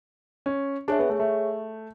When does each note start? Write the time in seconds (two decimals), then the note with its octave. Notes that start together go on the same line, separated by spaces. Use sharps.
0.46 C#4
0.88 D4 G#4 C#5 E5
0.99 B3
1.09 A3
1.20 A3